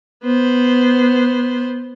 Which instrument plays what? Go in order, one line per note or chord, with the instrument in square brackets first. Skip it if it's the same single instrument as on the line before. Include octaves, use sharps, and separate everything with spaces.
[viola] B3 C5